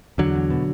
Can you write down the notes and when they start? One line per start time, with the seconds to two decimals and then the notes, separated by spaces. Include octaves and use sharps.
0.18 E2 D3 F#3
0.35 E2
0.50 B2